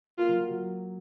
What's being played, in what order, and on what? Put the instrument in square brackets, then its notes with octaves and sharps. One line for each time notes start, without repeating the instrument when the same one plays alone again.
[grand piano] A#3 A#4 [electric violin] F4
[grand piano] F#3 F#4
F#3 F#4
F#3 F#4